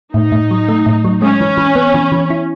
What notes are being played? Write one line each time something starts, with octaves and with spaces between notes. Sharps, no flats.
A2 D#4
A2
F#3
A3
A2
F#3
G#3 C#4
E3
E3
B3
E3
E3
E4